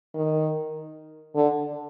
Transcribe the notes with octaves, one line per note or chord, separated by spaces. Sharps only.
D#3
D3